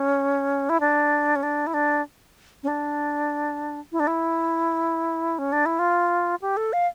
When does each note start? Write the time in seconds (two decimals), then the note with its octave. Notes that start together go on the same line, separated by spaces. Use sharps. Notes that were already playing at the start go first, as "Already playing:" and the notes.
Already playing: C#4
0.69 E4
0.80 D4
1.36 C#4
1.43 D4
1.67 E4
1.74 D4
2.63 C#4
2.68 D4
3.92 E4
4.00 D4
4.07 E4
5.39 C#4
5.52 D4
5.66 E4
5.79 F4
6.42 G4
6.57 A4
6.73 F5